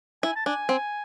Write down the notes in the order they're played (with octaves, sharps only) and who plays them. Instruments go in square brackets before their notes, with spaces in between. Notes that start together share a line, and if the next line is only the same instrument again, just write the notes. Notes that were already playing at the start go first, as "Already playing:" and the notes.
[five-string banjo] E4 [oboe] G#5
[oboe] A5
[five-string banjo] D4 [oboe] G#5
[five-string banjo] C4